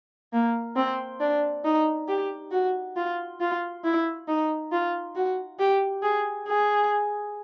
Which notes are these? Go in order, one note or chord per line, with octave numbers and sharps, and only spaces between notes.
A#3
C4
D4
D#4
G4
F#4
F4
F4
E4
D#4
F4
F#4
G4
G#4
G#4